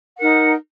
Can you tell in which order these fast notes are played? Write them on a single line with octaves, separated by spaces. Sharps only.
F#5 A#4 D#4